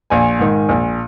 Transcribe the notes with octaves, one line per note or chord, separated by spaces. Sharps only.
A#1 G#5
G#2 D#3
A#1